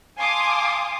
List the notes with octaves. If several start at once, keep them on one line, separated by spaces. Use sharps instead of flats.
F5 G#5 A5 C6 D6 D#6